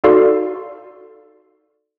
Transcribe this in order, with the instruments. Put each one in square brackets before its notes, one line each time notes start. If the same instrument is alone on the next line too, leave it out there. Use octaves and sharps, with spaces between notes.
[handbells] D#4 F#4 A4 D5 F5 C6